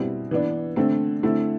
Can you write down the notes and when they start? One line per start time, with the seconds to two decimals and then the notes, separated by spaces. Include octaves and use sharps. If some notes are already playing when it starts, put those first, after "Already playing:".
Already playing: B2 G3 C4 E4
0.31 E3 B3 D4
0.76 D3 A3 C4
1.23 D3 A3 C4 E4